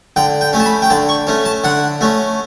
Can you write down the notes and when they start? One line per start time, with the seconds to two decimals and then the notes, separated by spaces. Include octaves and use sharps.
0.16 D3 G5
0.41 G5
0.53 A3 C#4
0.60 A5
0.66 B5
0.82 G5
0.90 D3 A5
1.09 C#6
1.27 A3 C#4
1.45 A5
1.64 D3 F#5
2.01 A3 C#4